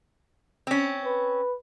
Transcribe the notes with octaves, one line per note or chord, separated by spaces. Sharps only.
C4 C#4
B4